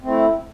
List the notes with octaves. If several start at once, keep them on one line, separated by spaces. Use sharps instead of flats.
A3 C4 E4